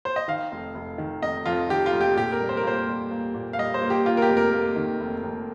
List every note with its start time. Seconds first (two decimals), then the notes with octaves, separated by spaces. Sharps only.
0.05 C5
0.16 D#5
0.28 D#3 F5
0.52 F1
0.75 F1
0.98 D#3
1.22 F1 D#5
1.46 F2 F4
1.69 D#3 G4
1.86 F4
1.93 F1
2.01 G4
2.16 A#2 G4
2.32 A#4
2.41 G3
2.49 C5
2.57 A#4
2.64 A#3 C5
2.88 G3
3.11 A#3
3.34 A#2
3.53 F5
3.58 G3 D#5
3.74 C5
3.82 A#3
3.90 G4
4.05 A#3 F4
4.17 A#4
4.22 G4
4.29 F1
4.37 A#4
4.53 A#3
4.76 D#3
5.01 F1
5.23 F1